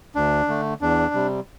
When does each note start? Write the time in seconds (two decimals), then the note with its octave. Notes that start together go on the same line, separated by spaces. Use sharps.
0.15 D2 D4
0.48 D3 A3
0.81 E2 D4
1.14 C3 G3